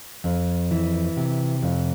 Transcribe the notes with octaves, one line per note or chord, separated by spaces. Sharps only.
F2
E3
C3
F2